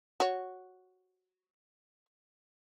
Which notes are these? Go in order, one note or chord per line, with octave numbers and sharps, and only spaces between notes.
F#4 C#5